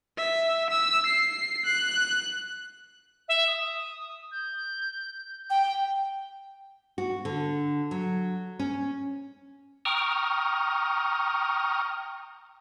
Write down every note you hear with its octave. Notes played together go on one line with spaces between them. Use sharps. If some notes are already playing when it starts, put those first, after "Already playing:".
E5
E6
C7
F#6
E5
D#6
G6
G5
F#4
D3
F#3
C#4
G5 A#5 C#6 D#6 F6